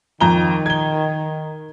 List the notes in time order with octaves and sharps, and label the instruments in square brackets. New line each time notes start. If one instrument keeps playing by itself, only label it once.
[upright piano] F2 A#5 G7 [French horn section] D#3
[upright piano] G#6 G7